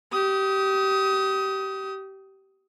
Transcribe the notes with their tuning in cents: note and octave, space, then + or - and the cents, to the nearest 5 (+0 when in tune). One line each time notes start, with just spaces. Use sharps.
G4 -20 D#6 +20